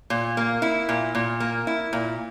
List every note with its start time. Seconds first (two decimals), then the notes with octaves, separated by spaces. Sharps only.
0.10 A#2
0.37 A#3
0.62 E4
0.89 A#2
1.15 A#2
1.40 A#3
1.67 E4
1.93 A#2